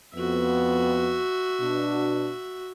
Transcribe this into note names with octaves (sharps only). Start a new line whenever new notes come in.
F2 B3 F#4 E5
B2 D4